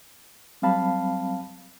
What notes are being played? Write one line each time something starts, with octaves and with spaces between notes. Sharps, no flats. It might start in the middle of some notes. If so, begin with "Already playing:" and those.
F#3 G3 C4 F5 A5 B5